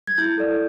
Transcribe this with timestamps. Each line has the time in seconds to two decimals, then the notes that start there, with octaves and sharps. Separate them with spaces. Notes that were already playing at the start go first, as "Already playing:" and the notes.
0.07 G#6
0.17 E4 G6
0.38 A4 D5